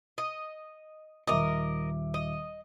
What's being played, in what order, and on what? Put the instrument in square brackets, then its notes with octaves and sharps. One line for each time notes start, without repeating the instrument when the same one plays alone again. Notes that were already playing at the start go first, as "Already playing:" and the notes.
[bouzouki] D#5
[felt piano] D#1 E5 D6 [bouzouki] A#4 D#5
[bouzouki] D#5